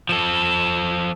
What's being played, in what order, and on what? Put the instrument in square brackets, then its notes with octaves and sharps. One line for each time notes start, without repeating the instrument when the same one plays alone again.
[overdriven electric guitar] F3 A4